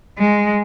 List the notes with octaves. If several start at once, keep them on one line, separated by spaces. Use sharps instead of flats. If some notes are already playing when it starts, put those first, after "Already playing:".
G#3